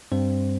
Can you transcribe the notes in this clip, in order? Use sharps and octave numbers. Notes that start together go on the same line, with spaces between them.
G2 G3 C4 C5